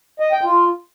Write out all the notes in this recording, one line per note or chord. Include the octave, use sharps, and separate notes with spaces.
D#5
G5
F4